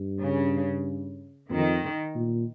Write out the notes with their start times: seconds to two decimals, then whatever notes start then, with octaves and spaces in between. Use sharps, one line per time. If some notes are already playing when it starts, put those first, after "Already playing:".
Already playing: G2
0.22 C#3
1.50 F2 D#3
2.15 A#2